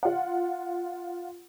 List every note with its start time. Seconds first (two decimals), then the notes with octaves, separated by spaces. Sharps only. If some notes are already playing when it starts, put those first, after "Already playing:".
0.03 F4 F#5